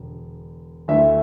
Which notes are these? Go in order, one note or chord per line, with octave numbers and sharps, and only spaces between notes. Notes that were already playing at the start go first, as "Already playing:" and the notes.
Already playing: E1 D3
D2 D3 A3 E4 E5